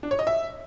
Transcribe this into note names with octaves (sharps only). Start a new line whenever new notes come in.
D4
C#5
D#5
E5